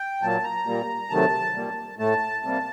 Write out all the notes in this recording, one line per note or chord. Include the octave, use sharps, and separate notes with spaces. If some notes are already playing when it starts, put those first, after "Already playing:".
Already playing: G5
A#2 F#3 A#3 A5
A#5
A#2 G3 A#3
C3 D#3 F#3 A3 A5
A#2 G3 A#3
A2 A3 A5
C3 G3 A#3